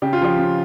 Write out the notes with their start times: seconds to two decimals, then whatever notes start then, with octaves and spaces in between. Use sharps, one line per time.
0.02 C#3 G4
0.13 F4
0.21 F3 G4
0.38 C#3